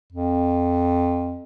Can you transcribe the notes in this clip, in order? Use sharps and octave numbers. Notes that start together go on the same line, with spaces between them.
F2